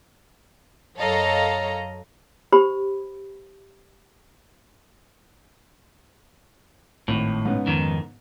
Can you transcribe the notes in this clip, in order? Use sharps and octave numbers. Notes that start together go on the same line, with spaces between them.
F#2 A4 C#5 D#5 F5 A#5
G4 C5 B5
G#1 A2
G#2 C#3 B3
F2 D#3